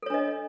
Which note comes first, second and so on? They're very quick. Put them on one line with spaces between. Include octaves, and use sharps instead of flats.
A4 C#5 D4 D#5